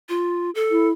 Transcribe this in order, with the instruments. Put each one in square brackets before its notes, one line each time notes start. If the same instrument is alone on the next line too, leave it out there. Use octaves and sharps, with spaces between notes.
[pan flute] F4
A4
[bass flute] E4